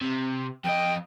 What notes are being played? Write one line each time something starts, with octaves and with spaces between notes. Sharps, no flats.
C3
F2 D#5 G5